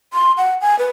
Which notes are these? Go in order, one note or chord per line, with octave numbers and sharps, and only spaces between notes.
C6
F#5
G#5
B4